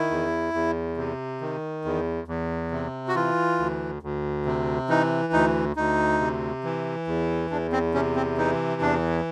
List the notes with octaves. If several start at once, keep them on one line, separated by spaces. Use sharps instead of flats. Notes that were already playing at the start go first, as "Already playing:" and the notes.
Already playing: D#3 E4
E2
E2
C3
D#3
E2
E2
C3
F#4
E3 F4
D2
D2
C3
E3 D#4
D2 D#4
D2 D#4
C3
E3
E2
E2 D4
C4
C3 C#4
C4
E3 D#4
E2 D4